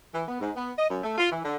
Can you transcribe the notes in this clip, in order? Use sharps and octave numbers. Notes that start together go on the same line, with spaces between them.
E3
B3
G#2
B3
D#5
F#2
A3
F4
E3
D3